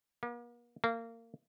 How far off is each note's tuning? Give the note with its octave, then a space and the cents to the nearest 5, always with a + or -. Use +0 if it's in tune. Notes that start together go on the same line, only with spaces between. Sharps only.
A#3 +45
A#3 -25